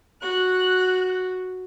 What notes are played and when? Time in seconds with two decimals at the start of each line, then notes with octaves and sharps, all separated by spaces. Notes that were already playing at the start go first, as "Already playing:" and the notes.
0.22 F#4 F#6